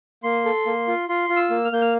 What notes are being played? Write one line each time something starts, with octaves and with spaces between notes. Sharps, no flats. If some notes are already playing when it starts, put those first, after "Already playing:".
A#3 C6
A4
A#3
F4
F4 C6
F4
E6
A#3
F6
A#3 G6
F6